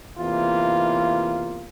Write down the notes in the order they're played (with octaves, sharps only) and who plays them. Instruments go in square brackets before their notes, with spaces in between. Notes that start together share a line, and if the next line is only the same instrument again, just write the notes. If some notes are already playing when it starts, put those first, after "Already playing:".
[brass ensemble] E2 C3 E3 A#3 F4